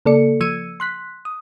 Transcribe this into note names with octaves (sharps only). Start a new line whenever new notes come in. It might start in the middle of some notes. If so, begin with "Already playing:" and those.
C#3 A#3 A4 D5 C#7
F3 E6 G#6 C#7 D#7
C6 F#6 B6
D#6